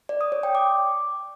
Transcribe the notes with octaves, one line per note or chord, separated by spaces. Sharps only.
D5
D#6
C#5
G5
D6